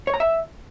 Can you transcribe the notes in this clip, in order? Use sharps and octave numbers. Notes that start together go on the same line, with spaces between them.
C#5
A#5
E5